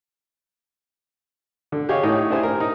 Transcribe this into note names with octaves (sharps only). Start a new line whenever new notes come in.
D3
G4 G#4 C#5 D#5 F5
A2 D#4 A4 C#5
D4 E4 G4 C5 G#5
A#4
D#4